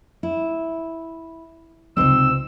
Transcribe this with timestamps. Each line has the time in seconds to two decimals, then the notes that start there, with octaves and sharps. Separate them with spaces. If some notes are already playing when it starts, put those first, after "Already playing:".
0.23 E4
1.97 C#2 C3 C4 D#4 C5 E6